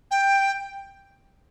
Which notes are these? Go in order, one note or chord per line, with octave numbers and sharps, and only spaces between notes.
G5